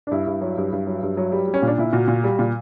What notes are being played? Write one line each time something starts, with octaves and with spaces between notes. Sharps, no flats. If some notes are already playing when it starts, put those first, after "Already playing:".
D4
G2 E4
G2
F#3
G2
G2
F#3
G2
F#3
G3
G3
C#4
A#2
D4
A#2 E4
A#2 F#4
A#2
G3
A#2